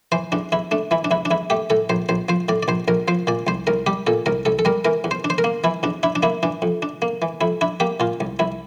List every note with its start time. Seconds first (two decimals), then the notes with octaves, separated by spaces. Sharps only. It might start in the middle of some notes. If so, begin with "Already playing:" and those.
0.12 E3 C5
0.32 E2 D4
0.52 E2 E4
0.71 A3 D4
0.91 E3 E4
1.05 D4
1.11 E2 E4
1.25 D4
1.31 E2 E4
1.50 A3 G4
1.70 A2 A4
1.90 A#1 C5
2.09 A#1 C5
2.29 F3 C5
2.49 A2 D5
2.63 D5
2.68 A#1 C5
2.88 A#1 A#4
3.08 F3 C5
3.27 A#2 D5
3.47 C2 C5
3.67 C2 A#4
3.87 G3 G4
4.07 A#2 A4
4.26 C2 A#4
4.45 C2 A4
4.59 A4
4.65 G3 A#4
4.85 E3 A#4
5.04 E2
5.11 C5
5.24 D4
5.30 C5
5.38 A#4
5.44 A#3
5.64 E3 E4
5.83 E2 D4
6.03 D4 E4
6.16 D4
6.23 A#3 E4
6.43 E3 D4
6.62 F2
6.82 D4
7.02 A#3
7.22 E3
7.41 F2 E4
7.61 D4 E4
7.80 A#3 G4
8.00 A#2 F4
8.20 C2
8.39 C2 E4